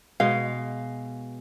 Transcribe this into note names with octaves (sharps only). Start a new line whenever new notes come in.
B2 G#3 F5